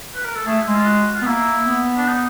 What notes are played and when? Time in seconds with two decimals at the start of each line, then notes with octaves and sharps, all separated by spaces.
0.15 B4
0.25 A#4
0.35 A4
0.46 A3 G#4
0.63 G#3 E4
0.74 F4
0.86 F#4
1.15 F4
1.22 B3
1.26 A#3 E4
1.67 B3
1.97 D4
2.07 D#4